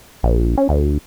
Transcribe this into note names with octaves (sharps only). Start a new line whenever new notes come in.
A#1
C#4
D2